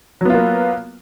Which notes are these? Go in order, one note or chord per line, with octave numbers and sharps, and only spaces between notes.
F#3 A#3 B3 F4